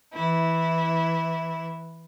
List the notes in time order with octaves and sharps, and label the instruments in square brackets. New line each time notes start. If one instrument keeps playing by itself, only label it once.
[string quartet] E3 E4